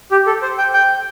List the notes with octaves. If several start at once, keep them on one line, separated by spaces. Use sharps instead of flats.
G4
A4
C5
G5
G5